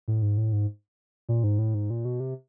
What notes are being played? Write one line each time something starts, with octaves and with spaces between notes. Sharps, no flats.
A2
G#2
A2
G#2
A#2
G#2
A2
G#2
A#2
B2
C3